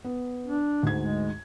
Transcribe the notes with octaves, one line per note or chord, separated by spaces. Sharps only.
B3
D4
D2 G#2 G#6
G#3